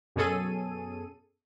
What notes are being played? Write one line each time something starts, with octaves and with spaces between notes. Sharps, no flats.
F#2 B2 C#4 G#4 A4 D#7